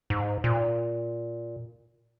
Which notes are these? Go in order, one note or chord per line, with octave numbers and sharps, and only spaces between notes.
G#2
A#2